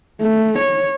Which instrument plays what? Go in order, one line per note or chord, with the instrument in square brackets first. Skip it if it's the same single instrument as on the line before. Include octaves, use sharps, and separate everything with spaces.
[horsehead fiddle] A3
C#5